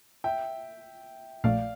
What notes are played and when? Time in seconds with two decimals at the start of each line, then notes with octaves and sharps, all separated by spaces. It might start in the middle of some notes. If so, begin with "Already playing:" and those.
0.24 E5 G5
1.44 A#1 A#2 A3 D5 F5